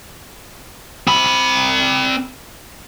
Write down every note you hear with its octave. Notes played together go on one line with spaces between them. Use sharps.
C4 B5